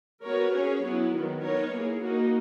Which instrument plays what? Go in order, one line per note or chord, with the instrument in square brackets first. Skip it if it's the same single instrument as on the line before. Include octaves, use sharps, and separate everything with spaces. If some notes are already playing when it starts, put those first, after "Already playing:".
[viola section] B3 F#4 A#4 C#5
C#4 G#4 C#5
F#3 B3 E4
D#3 F#3 B3
B3 D#4 A#4 C#5
A#3 E4 G#4
A#3 D#4 F#4